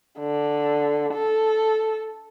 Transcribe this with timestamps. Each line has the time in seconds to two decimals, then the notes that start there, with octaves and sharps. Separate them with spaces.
0.20 D3
1.13 A4